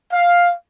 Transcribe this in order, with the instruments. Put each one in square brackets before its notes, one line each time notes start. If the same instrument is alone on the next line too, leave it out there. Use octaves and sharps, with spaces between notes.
[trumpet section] F5